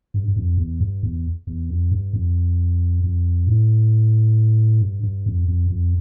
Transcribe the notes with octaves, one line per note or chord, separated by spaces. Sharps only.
G2
G2
F2
E2
G2
E2
E2
F2
G2
F2
F2
A2
G2
G2
F2
F2
F2